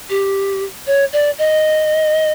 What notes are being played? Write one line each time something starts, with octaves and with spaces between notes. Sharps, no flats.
G4
C#5
D5
D#5